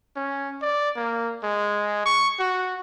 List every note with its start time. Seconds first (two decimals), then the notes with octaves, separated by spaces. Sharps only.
0.16 C#4
0.62 D5
0.96 A#3
1.43 G#3
2.06 C#6
2.40 F#4